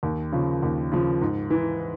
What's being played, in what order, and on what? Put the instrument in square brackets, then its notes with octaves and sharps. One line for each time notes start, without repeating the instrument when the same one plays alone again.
[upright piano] D#2
C#3 F3
D#2
C#3 F3
G#2
E3